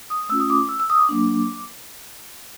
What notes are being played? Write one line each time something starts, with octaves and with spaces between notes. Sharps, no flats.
D#6
A3 C#4 F4 E6
D#6
D6
E6
E6
D#6
D6
F#3 A#3 D4